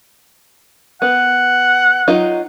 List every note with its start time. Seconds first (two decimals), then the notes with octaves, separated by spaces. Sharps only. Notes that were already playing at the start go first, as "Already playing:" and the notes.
1.02 B3 F#5
2.08 F#3 D#4 F4